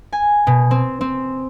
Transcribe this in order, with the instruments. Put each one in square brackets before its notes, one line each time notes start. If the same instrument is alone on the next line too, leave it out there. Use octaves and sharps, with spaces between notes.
[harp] G#5
B2
C4
C4